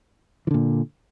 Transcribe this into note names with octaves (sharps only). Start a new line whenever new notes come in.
A#2 D3 E3